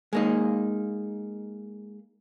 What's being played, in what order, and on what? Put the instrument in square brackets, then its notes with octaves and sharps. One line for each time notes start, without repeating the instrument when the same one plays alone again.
[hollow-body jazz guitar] G#3 A#3 D#4